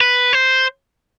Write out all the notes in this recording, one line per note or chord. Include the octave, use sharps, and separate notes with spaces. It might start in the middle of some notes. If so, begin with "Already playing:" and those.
B4
C5